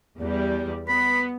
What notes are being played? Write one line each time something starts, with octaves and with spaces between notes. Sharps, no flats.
E2 G3
B3 B5